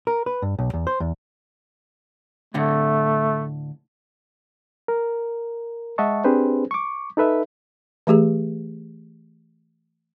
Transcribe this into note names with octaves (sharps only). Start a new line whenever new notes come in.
A#4
B4
G2
B1
E2
C5
E2
A2 D3 A3
A#4
G#3 D#5 E5 F#5 A5 C#6
C4 D4 G4 G#4 B4 C5
C#6 D6
D#4 A4 B4 E5
E3 A3 G4 G#4